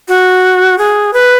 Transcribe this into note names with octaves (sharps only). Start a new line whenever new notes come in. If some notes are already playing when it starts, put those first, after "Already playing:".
F#4
G#4
B4